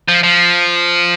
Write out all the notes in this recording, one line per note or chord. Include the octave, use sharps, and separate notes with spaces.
F3
F3